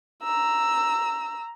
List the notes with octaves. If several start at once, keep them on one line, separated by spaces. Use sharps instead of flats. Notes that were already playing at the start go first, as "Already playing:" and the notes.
A#5 E6